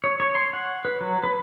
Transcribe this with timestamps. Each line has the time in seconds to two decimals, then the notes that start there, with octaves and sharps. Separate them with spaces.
0.04 C#5
0.20 C#5
0.35 C6
0.53 F#5
0.85 B4
1.01 F#3
1.24 B4